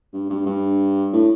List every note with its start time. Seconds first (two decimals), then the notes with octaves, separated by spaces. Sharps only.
0.13 G2
0.30 G2
0.46 G2
1.13 A2